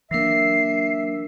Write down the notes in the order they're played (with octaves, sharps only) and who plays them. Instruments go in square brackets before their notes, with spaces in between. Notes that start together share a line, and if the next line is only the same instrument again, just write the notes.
[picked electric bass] E3 A#3 [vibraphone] F#3 D4 A#4 [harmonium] E5 [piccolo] C7